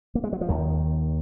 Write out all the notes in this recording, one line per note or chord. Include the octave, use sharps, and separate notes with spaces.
A#3
G#3
F#3
F3
D#2 D#3